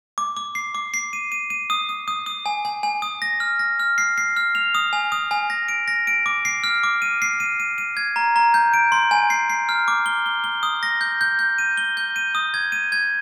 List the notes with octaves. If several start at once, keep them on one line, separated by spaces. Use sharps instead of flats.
D6
D6
C7
D6
C7
D#7
D#7
D#7
D#6
D#6
D#6
D#6
G#5
G#5
G#5
D#6
A#6
F6
A#6
F6
C7
C7
F6
F7
D#6
G#5
D#6
G#5
A#6
D7
A#6
D7
D6
C7
F6
D6
D#7
C7
D#7
D#7
D#7
G#6
A#5
A#5
G6
D7
C6
G#5
C7
C7
F6
D6
G7
G7
G7
D#6
A#6
G6
G6
G6
D#7
G7
G6
D#7
D#6
G#6
D#7
G#6